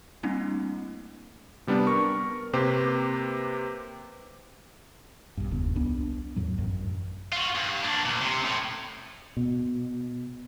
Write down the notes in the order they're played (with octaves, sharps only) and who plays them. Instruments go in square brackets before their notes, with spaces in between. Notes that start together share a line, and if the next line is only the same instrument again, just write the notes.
[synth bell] G3 A3 A#3 C4 D4 E4
[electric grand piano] C3 G3 B3 D4
A#4 C#6
C3 A#3 G4 B4 C5
[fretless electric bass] B1 G2
F1 D#2 C#3 B3
C2 B3 D4
E2 A2 F#3
A1 F#2
[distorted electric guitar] F4 F#4
G2
A#3 D4
D2 A#2
C3 C4
A2
[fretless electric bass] B2